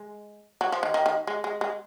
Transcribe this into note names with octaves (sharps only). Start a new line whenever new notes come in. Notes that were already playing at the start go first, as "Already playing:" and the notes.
Already playing: G#3
F#3
F3
D#3
D#3
D#3
G#3
G#3
G#3